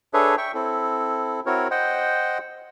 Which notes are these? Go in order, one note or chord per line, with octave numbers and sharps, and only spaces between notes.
D4 G#4 A4 B4 C#5 E5
E5 G5 C#6
C4 E4 A4
C4 E4 F#4 A#4 C#5
C5 D#5 F#5 G5